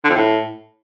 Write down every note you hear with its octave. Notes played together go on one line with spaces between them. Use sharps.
D3
F2
A2